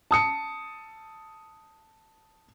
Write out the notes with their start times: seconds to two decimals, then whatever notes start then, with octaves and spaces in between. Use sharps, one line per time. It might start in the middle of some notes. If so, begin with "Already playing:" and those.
0.11 A5 D#6 C#7